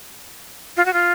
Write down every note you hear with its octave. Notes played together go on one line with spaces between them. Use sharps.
F4
F#4
F4